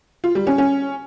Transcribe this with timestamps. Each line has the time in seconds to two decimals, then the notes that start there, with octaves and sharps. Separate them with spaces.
0.24 F4
0.35 G3
0.47 C#4
0.58 C#4